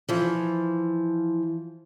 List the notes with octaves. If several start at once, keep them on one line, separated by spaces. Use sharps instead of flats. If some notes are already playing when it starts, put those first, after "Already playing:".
E3 F3